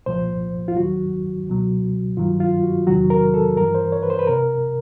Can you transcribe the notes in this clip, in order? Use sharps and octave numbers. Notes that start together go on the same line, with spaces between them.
C2 A#2 F3 C5
F4
D#2 D#3 F#3 F#4
C#2 B2 F#3
G2 D#3 F#3 F4
F4
F#4
E2 C3 D#3 F#3 F#4
A#4
A4
G2 E3 A#4
C5
C#5
B4
C5
B4
C3 A#4